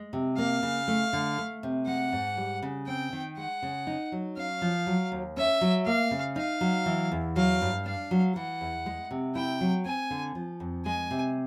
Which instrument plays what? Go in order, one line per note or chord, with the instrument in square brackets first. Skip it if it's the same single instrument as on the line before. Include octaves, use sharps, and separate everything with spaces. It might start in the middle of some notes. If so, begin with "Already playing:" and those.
Already playing: [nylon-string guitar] G#3
C3
[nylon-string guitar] A#3 [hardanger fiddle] F5
[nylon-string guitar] C#3
A3
D3
A3
C3
[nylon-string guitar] G#3 [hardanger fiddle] F#5
[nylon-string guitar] G#2
G3
C#3
[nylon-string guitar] C4 [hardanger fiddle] G5
[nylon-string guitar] D#3
[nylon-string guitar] G#3 [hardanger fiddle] F#5
[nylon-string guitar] C#3
D#4
F#3
[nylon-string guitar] C#4 [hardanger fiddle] F5
[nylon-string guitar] F3
F#3
D#2
[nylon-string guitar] C#4 [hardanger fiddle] E5
[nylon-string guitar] F#3
[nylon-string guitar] A#3 [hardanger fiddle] F5
[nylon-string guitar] C#3
[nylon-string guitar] D#4 [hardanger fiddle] F5
[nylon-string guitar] F#3
E3
E2
[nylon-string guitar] F#3 [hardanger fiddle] F5
[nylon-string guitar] G2
[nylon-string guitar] D4 [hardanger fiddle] F5
[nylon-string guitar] F#3
[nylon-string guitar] E3 [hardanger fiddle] F#5
[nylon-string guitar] E2
G#3
C3
[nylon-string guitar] E4 [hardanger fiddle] G5
[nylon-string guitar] F#3
[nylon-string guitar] C4 [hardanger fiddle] G#5
[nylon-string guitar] D3
F3
F2
[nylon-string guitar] G#3 [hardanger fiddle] G#5
[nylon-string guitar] C3